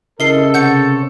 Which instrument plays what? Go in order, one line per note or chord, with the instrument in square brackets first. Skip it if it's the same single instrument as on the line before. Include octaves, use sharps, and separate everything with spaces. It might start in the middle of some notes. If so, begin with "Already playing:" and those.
[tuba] C#3 [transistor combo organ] E4 D#5 [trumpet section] A4 [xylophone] A#4 C7 G7
[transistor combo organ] C3 C#5 [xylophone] F#5 G6 C#7